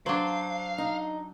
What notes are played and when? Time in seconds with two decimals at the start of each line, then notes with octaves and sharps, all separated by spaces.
0.06 F#3 D4 C5 F5
0.78 D#4